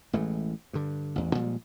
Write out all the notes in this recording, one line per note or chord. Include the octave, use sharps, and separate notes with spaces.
A1 E3 G#3 A3
G2 D3
A1 E2
A#2 F3 G3 G#3